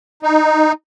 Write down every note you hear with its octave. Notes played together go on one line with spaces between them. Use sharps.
D#4